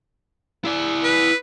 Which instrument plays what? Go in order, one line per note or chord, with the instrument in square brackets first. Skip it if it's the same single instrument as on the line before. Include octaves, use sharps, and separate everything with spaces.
[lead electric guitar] E4 D5
[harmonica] B4